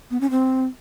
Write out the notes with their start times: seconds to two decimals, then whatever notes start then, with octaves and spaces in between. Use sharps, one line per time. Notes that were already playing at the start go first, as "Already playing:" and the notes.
0.11 B3
0.21 C#4
0.30 C4